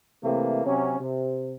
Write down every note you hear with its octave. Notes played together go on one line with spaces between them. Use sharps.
C3 E3 A3 A#3
C3 F#3 C#4
C3